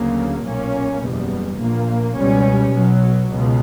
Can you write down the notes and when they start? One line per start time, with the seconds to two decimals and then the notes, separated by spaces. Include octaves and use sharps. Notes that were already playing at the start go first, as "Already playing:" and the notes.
Already playing: D2 C#3 F#3 A#3
0.44 B1 A#2 A#3 C#4
1.01 F#1 E2 B2 G3
1.58 A#1 A#2 A#3
2.16 C#2 B2 G3 C#4
2.73 B1 B2 F#3
3.31 C#2 B2